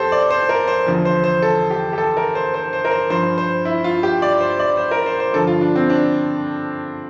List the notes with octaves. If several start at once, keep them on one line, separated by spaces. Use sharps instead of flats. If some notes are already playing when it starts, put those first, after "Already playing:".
Already playing: F2 G4 A4 C5
D5
C5
A#4
C5
E2 D3 F3
C5
C5
A4
G4
G4
A4
A#4
C5
C5
C5
A#4
C5
G2 F3 C5
C5
E4
F4
G4
D5
C5
D5
C5
A#4
C5
C5
G2 D3 F3 A4
F4
D4
C4
D4